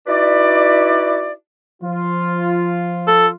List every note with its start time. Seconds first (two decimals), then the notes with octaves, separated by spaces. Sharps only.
0.07 D#4 E4 F#4 B4 D5
1.83 F3 F4
3.07 A4